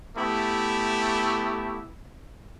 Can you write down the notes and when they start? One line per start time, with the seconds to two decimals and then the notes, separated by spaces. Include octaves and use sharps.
0.17 A3 B3 E4 G4